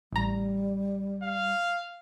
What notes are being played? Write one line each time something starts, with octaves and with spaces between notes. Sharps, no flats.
A1 G3 A#5
F5